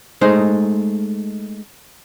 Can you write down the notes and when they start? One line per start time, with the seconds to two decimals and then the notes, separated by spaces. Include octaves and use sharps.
0.21 G#3 A3 D#4 C5